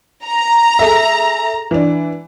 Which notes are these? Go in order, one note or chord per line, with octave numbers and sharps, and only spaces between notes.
A#5
G#4 A4 E5
E3 D4